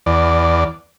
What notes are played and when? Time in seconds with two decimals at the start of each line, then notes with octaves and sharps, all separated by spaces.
0.06 E2 D5